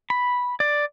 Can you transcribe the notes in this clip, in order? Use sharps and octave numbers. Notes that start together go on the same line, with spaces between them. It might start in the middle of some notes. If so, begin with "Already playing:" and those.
B5
D5